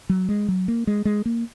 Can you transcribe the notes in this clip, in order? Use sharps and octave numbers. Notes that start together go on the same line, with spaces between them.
F#3
G#3
F#3
A#3
G#3
G#3
A#3